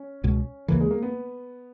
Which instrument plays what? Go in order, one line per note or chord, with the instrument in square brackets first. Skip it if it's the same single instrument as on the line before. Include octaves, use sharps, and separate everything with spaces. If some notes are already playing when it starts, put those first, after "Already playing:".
Already playing: [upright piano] C#4
[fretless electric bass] C#2 B2 G#3
[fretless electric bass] D#2 C#3 E3 [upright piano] A#3
[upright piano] G#3
A#3
B3